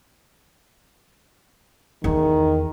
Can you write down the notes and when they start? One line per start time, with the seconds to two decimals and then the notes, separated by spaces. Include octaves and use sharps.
2.04 E2 D#3 D#4